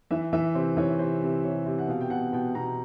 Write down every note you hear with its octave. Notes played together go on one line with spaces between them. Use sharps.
E3 E5
E3 E5
C3 C5
E3 C#5
C3 C5
C3
C3 C#5
C3
F#5
B2 F5
G5
B2 F#5
B2 G5
B2 A#5